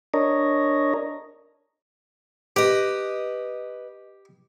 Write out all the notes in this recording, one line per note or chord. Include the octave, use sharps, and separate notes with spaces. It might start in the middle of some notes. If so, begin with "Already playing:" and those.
D4 A#4 C#5 D#5
G4 B4 D#5